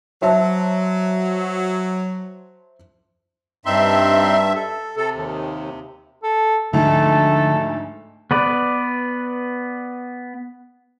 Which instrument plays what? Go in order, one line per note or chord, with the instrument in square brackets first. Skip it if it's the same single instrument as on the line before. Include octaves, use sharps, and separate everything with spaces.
[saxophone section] F#3 [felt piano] C5 E5 A5
[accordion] G2 E5 [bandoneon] C4 D#4 C6
[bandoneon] A4
[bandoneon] C3 [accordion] A4
[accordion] D#2
[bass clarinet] A4
[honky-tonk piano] D2 G#2 [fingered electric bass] D3 F3 D4 [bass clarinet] A3 [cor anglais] A4
[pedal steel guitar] B3 B4 D5